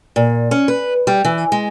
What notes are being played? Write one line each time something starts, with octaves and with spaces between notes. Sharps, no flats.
A#2
C#4
B4
G3
E3
G#3